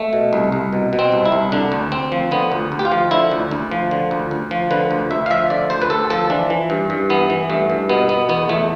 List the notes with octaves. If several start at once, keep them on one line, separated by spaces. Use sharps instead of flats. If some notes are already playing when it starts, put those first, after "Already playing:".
Already playing: A3
B2
C2
C2
B2
B2
C4
C2
E4
C2
D3 D4
D2
D2 C4
F3
D3 B3
D2
D2
G4
F4
F3
D3 E4
D2
D2
F3
D3
D2
D2
F3
D3 B4
D2
D2 E5
F5
F3 E5
D3 D5
D2 C5
B4
D2 A4
F3 A4
E3 D4
E3
G2
G2
E3 B3
E3
G2 A3
G2
B2 B3
B2 B3
E2 B3
E2 A3